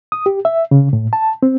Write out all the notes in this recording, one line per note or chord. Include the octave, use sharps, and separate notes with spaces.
D#6
G4
E5
C#3
A2
A5
C4